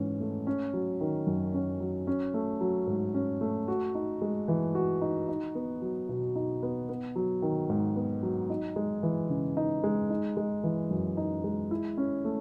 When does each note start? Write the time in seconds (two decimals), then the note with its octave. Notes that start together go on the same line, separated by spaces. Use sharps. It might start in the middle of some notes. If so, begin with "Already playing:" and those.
Already playing: G#2 E3 C#4
0.20 A3
0.47 C#4
0.73 F#3
1.01 D#3
1.27 F#2
1.54 C#4
1.80 F#3
2.07 C#4
2.34 A3
2.61 F#3
2.87 G#2
3.14 C#4
3.41 A3
3.68 F#4
3.95 D#4
4.22 G#3
4.48 E3
4.75 F#4
5.01 D#4
5.28 D#4
5.55 B3
5.82 F#3
6.09 B2
6.36 D#4
6.63 B3
6.89 B3
7.16 F#3
7.42 D#3
7.70 G#2
7.96 B3
8.23 F#3
8.50 D#4
8.76 G#3
9.03 E3
9.30 C#3
9.57 D#4
9.84 G#3
10.10 D#4
10.37 G#3
10.64 E3
10.91 F#2
11.17 D#4
11.44 G#3
11.71 E4
11.97 C#4
12.25 A3